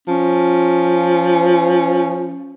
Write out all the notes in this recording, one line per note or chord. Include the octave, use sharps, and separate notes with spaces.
F3 C#4